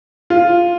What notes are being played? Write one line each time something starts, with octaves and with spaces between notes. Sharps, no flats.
F4